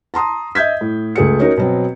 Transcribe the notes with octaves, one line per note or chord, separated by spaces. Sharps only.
A5 A#5 C6 D#6
D#5 E5 G6 G#6 B6
A2
C#2 A3 G#4 A4 C#7
C#4 D#4 F#4 A#4
B2 F#3 C4